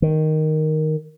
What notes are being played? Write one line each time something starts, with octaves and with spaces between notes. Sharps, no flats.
D#3